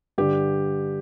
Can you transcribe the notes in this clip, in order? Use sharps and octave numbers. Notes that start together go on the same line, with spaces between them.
G2 D3 G4